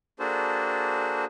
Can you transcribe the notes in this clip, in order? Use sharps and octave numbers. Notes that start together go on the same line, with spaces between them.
A#3 D4 F#4 G#4 A4 C5